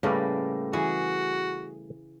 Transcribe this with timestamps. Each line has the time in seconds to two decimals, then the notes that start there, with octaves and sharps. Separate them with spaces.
0.03 A2 C#3 G3 A3 A#3 B4
0.73 E3 F#4 G#4